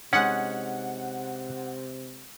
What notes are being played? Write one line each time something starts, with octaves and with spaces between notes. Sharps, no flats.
C3 G#3 C#4 D#4 F#5